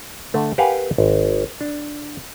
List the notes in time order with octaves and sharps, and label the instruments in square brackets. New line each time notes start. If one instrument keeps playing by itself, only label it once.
[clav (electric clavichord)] D3 A3
G4 A#4 B4 F5 F#5 G#5
G#1
D4